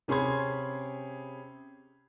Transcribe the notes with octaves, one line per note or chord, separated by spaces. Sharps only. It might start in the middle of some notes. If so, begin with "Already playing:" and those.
C3 C#4 G#4 B5 C6 G#6